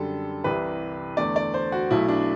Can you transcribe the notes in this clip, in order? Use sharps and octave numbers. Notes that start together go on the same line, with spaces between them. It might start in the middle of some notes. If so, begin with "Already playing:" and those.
Already playing: F#2 D3 G3 A4
C2 C3 E3 B4
E2 D3 A3 D5
D5
C5
F#4
B1 B2 F#3 A3 E4
D4